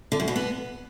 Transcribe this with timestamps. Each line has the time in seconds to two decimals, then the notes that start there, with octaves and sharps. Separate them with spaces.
0.12 D3
0.20 F#2
0.28 B2
0.36 B3